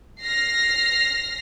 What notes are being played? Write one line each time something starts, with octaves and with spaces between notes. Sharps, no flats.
F6 A#6 C7